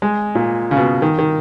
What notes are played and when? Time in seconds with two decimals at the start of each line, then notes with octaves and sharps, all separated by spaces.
0.02 G#3
0.35 A#2
0.71 C#3
0.77 B2
1.02 D#3
1.19 D#3